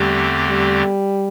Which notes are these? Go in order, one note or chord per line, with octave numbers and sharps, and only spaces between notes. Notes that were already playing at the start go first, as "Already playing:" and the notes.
Already playing: E2 D3 G3 A3 C4 G4
G3